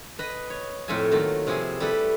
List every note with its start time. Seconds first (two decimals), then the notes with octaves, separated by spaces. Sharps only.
0.19 B4 D#5
0.50 C#5
0.88 F2 A2 A3 F4 E5 G#5
1.11 D#3 F#3 A3 A#3 F4
1.47 C3 F3 E4 G#4
1.80 G3 A3 A4 B4